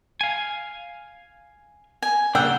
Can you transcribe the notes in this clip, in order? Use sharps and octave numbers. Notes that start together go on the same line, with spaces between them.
F5 G#5
G#5
C#3 G3 A#3 D4 F#5 G5 E6